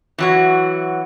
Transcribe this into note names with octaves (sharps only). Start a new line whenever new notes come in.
E3 F#3 F#4